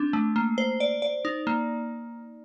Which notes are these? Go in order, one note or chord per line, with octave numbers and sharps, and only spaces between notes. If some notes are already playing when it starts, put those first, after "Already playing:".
Already playing: C4 D4
A3
A#3
C5
D5
D5
D#4
A#3